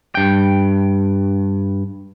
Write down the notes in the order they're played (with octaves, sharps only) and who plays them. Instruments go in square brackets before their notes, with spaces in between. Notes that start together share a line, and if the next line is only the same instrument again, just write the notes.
[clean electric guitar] G2 G5